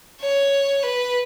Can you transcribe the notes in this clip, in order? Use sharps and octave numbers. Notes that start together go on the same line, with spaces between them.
C#5
B4